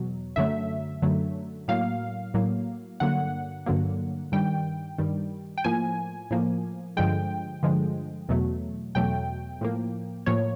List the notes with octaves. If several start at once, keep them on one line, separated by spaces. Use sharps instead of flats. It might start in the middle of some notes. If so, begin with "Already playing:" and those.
Already playing: E2 B2 F#3
F#2 D3 F#3 A3 E5
F#2 D3 F#3 A3
A2 F#3 A#3 F5
A2 F#3 A#3
G2 D3 F#3 A#3 F#5
G2 D3 F#3 A#3
G2 D#3 G3 G5
G2 D#3 G3
G5
A2 F3 A#3 G#5
A2 F3 A#3
G2 D3 F3 G#3 G5
G2 D3 F3 G#3
E2 B2 F#3 A3
E2 B2 F#3 A3 G5
A2 F3 A#3
A2 F3 A#3 C#5